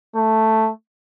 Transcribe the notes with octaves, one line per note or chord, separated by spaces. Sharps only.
A3